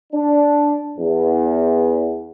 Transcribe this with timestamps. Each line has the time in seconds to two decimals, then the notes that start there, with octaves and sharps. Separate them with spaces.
0.13 D4
0.98 E2